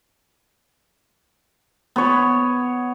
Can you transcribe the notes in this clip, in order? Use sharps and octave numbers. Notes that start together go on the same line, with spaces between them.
B3 C#5